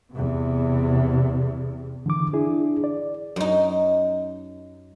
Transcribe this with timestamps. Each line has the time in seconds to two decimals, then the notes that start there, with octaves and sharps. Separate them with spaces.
0.12 E2 C3
2.06 D3 E3 D6
2.33 D4 E4 G#4
2.84 D5
3.36 F#2 D#4